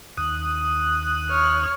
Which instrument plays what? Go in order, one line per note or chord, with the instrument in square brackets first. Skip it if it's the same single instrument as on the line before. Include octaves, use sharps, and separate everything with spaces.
[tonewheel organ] D#2 D#6 F#6
[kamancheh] C#5 F6